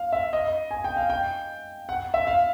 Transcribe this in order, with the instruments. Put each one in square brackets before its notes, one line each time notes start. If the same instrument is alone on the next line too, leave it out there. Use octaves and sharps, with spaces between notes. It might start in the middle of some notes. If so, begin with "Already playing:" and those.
Already playing: [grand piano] F5
E5
D#5
G#5
G5
F5
G5
F#5
E5
F5